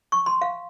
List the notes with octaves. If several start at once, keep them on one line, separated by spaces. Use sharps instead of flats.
C#6
C6
F5